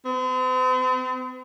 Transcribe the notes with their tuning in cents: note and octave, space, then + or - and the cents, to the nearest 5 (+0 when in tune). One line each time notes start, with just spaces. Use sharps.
C4 -45